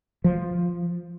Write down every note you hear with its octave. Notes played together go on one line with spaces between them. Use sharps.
F3